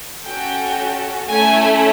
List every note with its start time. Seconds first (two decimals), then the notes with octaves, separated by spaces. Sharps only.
0.24 C#4 F#4 A4 G5
1.29 A3 C#4 E4 G#5